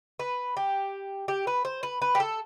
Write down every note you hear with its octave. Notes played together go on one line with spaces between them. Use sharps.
B4
G4
G4
B4
C5
B4
B4
G4
A4